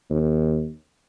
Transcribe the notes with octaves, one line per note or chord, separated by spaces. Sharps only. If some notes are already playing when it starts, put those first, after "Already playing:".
D#2